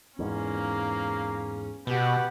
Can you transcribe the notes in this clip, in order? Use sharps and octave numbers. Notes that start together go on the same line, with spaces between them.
E2 G#2 A#3 C#4
B2 G4 B4 F#5